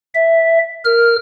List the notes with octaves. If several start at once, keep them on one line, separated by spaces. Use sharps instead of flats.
E5
A#4 F6